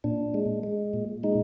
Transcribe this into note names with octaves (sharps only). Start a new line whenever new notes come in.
A#2 D4
G#3
G#3
A#2
G#3 D#4